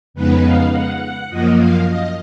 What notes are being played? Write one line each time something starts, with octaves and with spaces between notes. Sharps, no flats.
F2 C#3 G#3 B3 D#4 B4
F5
F#5
F#5
F#2 F3 A#3 D#5
F5
D#5